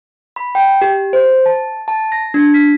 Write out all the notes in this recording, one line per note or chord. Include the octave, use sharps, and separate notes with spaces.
B5
G5
G4
C5
A5
A5
A#6
D4
B6